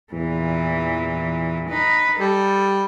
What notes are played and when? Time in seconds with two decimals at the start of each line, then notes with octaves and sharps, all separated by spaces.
0.12 E2 A#2 E3
1.69 D#4 B4
2.19 G3 A4